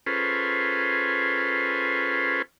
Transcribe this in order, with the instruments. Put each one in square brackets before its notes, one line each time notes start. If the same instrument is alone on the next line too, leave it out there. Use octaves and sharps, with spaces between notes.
[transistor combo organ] C#4 F4 G#4 A4 B4 C5